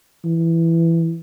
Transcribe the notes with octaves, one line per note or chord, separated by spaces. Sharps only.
E3